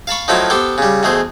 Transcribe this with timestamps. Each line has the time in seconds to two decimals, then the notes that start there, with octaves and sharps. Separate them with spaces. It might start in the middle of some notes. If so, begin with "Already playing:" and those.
0.07 F5 A5 B5 C#6
0.28 D#3 F3 F#3 A3 E4 F4
0.50 B3 G4 A4 C5
0.78 C#3 G3
1.03 E2 B2 A3 G#4 C5